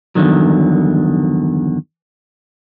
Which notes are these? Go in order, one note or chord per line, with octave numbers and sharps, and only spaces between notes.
E2 G2 B2 D3 D#3 F#3